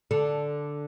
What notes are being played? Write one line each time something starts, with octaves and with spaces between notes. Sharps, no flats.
D3 A4